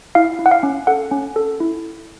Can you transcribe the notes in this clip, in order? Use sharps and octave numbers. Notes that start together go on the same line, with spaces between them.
E4 F5
E4
F#5
F5
C#4
A4 F#5
C#4
A4
E4